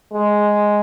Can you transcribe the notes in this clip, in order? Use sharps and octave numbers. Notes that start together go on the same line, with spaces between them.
G#3